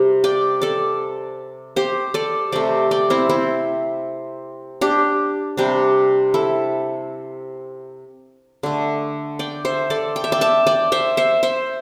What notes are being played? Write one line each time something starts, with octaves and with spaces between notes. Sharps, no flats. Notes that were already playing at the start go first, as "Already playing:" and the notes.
Already playing: C3 G3
D5 G5
A4 D5
G4 C5
A4 D5
C3 A3 D5 G5
D5 G5
C4 E4
C4 E4
D4 G4
C3 G3 D4 G4
E4 A4
D3 A3
D5 G5
C5 E5
A4 D5
G5
E5
D5 G5
E5 A5
D5 G5
C5 E5
C5 E5
C5 E5